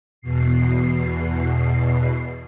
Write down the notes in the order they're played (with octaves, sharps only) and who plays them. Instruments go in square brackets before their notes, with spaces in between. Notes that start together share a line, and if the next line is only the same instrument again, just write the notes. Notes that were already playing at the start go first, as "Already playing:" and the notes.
[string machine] E2 B2 C7